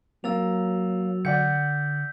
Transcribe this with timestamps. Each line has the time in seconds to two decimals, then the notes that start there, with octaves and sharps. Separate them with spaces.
0.24 F#3 A#3 E6 A6 F7
1.25 D3 D5 F#5 G6 B6 C#7